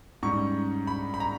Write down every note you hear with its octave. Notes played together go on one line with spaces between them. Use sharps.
G#2 G3 C#4 C#6
B5
B5
A#5